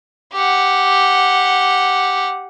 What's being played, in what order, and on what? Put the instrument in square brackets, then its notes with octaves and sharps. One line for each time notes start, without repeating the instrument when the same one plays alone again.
[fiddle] G4 F#5